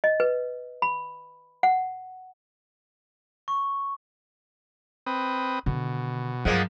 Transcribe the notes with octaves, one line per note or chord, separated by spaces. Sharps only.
D#5
B4
B5
F#5
C#6
C4 B4 D#6
B2 D3 D#3
G2 F3 F#3 G#3 A#3 F#5